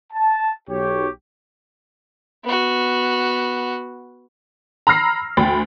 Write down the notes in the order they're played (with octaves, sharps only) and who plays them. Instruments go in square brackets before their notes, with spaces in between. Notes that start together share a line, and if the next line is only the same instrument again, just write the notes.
[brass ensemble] A5
B1 G4 C#5
[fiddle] B3 F#4
[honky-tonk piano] A#5 B5 E6 F6 A#6 C7
D2 G5 B5 A6